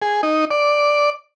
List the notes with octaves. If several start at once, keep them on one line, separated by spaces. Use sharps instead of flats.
G#4
D#4
D5